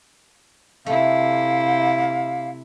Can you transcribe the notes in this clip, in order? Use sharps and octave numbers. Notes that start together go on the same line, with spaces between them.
C3 A3 E4 F5